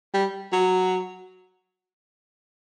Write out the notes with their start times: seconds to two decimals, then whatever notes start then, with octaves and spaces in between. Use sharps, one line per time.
0.14 G3
0.52 F#3